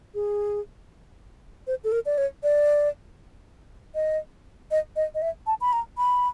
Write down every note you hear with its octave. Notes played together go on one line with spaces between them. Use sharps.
G#4
C5
A4
A#4
D5
C#5
D5
D#5
D#5
D#5
D#5
E5
A5
B5
A#5
B5